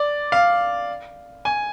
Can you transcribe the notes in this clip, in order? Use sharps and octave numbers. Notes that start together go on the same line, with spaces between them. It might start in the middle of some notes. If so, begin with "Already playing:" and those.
Already playing: D5
F5
G#5